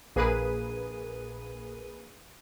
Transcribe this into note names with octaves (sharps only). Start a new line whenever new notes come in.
A#1 A#3 G#4 B4 D#7